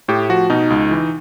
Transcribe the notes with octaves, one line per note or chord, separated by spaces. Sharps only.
A2 G4
F3 F#4
B2 D#4
C#2
E3